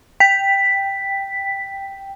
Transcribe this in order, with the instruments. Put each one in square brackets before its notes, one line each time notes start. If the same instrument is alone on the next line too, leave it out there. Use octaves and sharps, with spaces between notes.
[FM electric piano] G5 [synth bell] B6